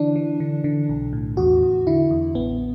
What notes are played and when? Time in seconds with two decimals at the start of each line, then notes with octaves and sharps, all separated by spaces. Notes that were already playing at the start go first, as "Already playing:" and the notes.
Already playing: D3 E3 D4
0.16 E3
0.40 D3
0.64 D3
0.89 B1
1.13 A2
1.37 E2 F#4
1.63 E2
1.87 D3 E4
2.11 E2
2.35 A1 B3